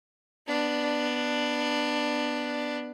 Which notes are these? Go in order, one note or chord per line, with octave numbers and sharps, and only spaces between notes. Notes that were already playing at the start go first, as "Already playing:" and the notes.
B3 D4